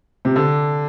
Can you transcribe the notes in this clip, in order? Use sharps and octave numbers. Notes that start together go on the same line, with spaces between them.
C3
D3